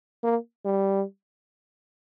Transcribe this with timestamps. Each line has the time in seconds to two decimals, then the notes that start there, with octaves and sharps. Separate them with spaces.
0.24 A#3
0.65 G3